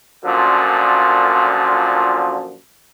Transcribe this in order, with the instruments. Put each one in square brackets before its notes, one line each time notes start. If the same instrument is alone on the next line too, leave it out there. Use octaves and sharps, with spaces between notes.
[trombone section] F#2 A#2 D3 F3